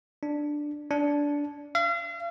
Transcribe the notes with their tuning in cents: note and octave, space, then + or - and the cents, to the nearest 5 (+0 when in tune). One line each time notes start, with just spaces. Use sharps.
D4 +5
D4 -15
F5 -40